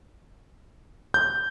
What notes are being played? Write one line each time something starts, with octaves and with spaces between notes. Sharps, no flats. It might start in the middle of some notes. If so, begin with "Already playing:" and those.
G6